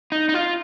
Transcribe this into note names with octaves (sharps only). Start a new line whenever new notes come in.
D#4
D#4
F4